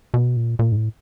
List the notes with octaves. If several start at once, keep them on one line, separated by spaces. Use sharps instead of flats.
B2
A#2
A#2
G#2
A2